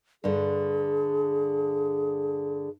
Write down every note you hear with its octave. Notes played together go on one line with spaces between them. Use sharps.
G2 D3 G#4